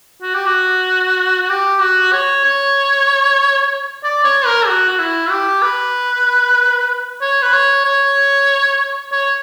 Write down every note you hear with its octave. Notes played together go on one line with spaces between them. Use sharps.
F#4
G4
F#4
F#4
G4
F#4
C#5
C#5
D5
C#5
A#4
F#4
F#4
E4
G4
B4
C#5
B4
C#5
C#5
C#5